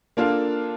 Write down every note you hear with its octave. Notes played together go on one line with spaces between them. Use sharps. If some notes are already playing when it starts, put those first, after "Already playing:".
A#3 D4 F4 A4